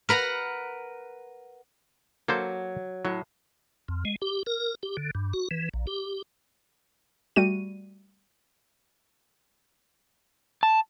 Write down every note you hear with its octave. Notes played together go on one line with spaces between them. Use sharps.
A#4 B4 F#5 A#5
F#3 A#3 A4 C5
A2 F#3
F2
G#3
G4
A#4
G4
D3
G2
F#4
E3
A#1
G4
G3 A3 F#4 D#7
A5